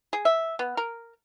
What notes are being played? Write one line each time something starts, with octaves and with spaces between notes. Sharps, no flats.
G#4
E5
B3
A#4